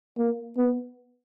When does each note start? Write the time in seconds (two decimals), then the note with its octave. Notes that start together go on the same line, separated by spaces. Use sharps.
0.18 A#3
0.57 B3